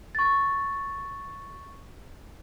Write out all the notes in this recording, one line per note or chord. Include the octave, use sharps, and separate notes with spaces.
C#6 A6